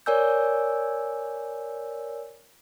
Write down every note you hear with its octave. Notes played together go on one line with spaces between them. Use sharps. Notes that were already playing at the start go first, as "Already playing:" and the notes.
A#4 C#5 D5 G#5 E6 G6